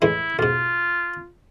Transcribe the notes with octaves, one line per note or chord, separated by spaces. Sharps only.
A2 E3 G#3 E4
B1 G#2 F4